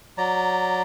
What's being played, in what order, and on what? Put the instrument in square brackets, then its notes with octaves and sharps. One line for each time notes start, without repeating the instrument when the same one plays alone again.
[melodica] F#3 D5 A#5